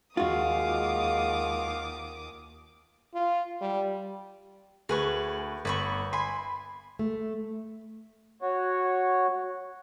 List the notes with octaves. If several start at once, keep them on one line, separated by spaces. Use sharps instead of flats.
D#2 G#3 F4 F#4 F5 D6 D#6
F4
G3
D2 G#4 B4 C#6
G1 B4 B5 C#6
G#5 B5 C6
A3
F#4 C#5